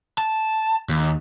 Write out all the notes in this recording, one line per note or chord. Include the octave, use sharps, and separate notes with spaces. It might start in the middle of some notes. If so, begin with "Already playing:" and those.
A5
D#2